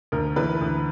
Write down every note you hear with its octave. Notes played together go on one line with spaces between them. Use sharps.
D2 A#4
E3 B4
D2